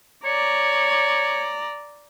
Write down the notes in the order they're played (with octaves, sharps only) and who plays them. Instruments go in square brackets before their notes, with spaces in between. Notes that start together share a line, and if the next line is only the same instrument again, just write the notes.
[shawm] C#5 [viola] D5 A#5